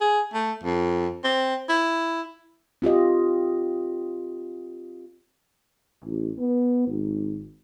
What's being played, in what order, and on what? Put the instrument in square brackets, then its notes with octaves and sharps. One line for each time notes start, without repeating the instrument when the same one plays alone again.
[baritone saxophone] G#4
A3
F2
C4
E4
[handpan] C4 F4 G4 D#5
[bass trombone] A1
B3
G#1